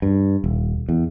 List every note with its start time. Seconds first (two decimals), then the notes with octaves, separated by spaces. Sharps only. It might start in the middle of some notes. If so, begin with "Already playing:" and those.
0.02 G2
0.44 D#1
0.89 E2